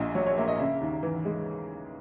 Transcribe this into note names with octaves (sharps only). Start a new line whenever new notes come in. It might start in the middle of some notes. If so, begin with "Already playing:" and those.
Already playing: A#1 A#2 D#5
F#3 C#5
C#5
A#3 E5
D#5
C#3 E5
D#2
E3
G#3